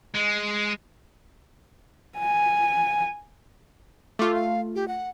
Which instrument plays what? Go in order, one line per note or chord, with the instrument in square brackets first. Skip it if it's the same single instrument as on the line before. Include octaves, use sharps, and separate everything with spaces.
[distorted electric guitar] G#3
[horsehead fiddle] G#5
[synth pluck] A3 F4 [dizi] D6
[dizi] F5
G4
F#5